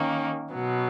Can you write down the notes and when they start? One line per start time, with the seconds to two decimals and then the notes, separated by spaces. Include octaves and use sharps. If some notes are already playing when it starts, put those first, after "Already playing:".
Already playing: D#3 A#3 C#4
0.53 B2 F#3 B3